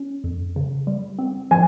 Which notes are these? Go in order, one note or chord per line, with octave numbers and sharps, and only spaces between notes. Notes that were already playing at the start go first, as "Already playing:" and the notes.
Already playing: C#4
F2
C#3
G3
C4
F3 G#5